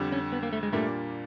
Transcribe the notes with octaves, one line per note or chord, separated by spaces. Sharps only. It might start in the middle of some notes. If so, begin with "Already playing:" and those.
Already playing: F2 D3 G3
C#4
B3
A#3
A3
G#3
A#2 G3 A3 A#3 D4